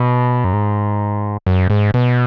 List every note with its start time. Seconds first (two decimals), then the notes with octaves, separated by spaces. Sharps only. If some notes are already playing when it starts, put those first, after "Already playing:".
Already playing: B2
0.44 F#2
0.53 G#2
1.47 F#2
1.70 G#2
1.94 B2